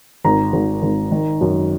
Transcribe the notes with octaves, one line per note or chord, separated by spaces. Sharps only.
G#1 A#5
G#1
G#1
D#3
F#2